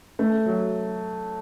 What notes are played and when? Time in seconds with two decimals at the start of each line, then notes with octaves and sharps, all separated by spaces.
0.19 A3
0.46 F#3